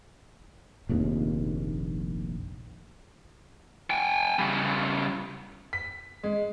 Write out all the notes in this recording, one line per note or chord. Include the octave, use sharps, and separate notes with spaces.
F1 A#1 D#2
G5 G#5
C#3 G3
B6
G#3